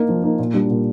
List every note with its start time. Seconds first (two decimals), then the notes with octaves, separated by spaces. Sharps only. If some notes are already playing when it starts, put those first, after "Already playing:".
Already playing: A#3 D#4
0.09 F3
0.24 A#3 D#4
0.39 A#2
0.54 G3 D4
0.70 A#2